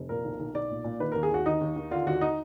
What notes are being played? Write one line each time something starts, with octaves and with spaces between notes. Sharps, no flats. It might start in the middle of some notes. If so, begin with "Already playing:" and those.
Already playing: F1
A#2 A#4
B1
B1
B1 D5
A#2
A#2
D#3 B4
D#2 A#4
G#4
D#2 F#4
D#3 D#4
D#2
D#3
D3 F4
D#2 F#4
D#4